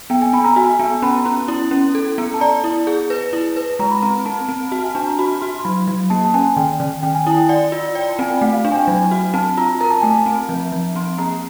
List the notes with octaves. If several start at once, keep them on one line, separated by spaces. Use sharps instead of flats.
B3 G5
G#5
B3 B5
A#5
F#4 G#5
B3 A5
C#4 B5
A#5
A5
C#4 A#5
E4
C#4
A4
B3
A5
D5 A#5
E4
G#4
B4
E4
B4
G#3 A#5
B5
C4 A#5
C4 A5
C4
F#4 A5
G#5
D4 A5
A#5
F#4 B5
F#4 C6
C6
F#3 B5
F#3
A#3 A5
A5
C#4 G#5
D#3 G5
D#3
D#3 G5
G#5
E4 A5
G5
D5 F#5
F4
D5 G5
A5
C4 G#5
G5
A3 F#5
F5
D4 F5
G#5
G5
F#3 G#5
F#4
C4 A5
F4 A#5
A#4 A#5
A5
A3 G#5
A5
C4
F3
F3
C4 C6
A#3 A#5